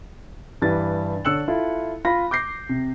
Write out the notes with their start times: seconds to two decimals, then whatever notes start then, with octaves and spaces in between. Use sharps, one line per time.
0.62 G2 E3 G4 B4 A6
1.25 D3 C#5 E6 F#6 C#7 F#7
1.48 E4 F4 A4
2.05 F4 B5 A#6
2.31 D6 G6 A#6 C7
2.69 C3